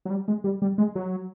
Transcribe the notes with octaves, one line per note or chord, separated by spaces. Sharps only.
F#3
G3
G#3
G3
G3
G#3
F#3